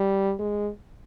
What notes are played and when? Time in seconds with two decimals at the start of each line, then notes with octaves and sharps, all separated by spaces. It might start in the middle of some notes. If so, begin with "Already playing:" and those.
Already playing: G3
0.39 G#3